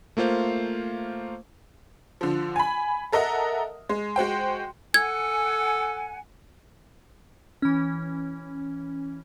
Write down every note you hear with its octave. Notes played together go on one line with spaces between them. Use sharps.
A3 A#3 F4 C5 F5
D3 F3
G#5 B5
A4 A#4 D#5 E5 F#5
G#3
G#3 F#4 C5 G5
A4 F#5 G#5 G#6
E3 C#4